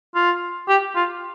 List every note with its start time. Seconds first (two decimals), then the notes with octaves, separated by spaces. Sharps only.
0.15 F4
0.68 G4
0.95 F4